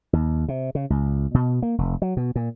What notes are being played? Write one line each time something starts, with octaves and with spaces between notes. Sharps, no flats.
D#2
C3
C#3
C#2
B2
A#3
F1
F#3
B2
A#2